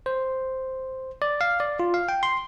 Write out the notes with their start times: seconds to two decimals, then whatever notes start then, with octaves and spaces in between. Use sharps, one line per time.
0.06 C5
1.22 D5
1.41 F5
1.60 D5
1.80 F4
1.94 F5
2.09 G5
2.23 C6